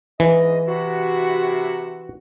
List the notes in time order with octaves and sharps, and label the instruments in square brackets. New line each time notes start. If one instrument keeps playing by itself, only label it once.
[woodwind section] G#2 D#5 [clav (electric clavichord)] E3
[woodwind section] C3 E4 F#4